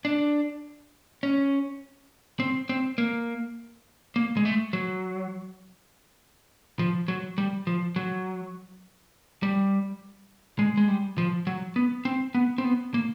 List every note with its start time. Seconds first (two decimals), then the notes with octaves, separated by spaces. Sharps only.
0.05 D4
1.23 C#4
2.40 C4
2.69 C4
2.98 A#3
4.16 A#3
4.37 G#3
4.45 A3
4.73 F#3
6.79 F3
7.08 F#3
7.38 G3
7.67 F3
7.96 F#3
9.43 G3
10.59 G#3
10.77 G#3
10.88 G3
11.18 F3
11.47 F#3
11.76 B3
12.05 C4
12.35 B3
12.58 C4
12.64 B3
12.94 A#3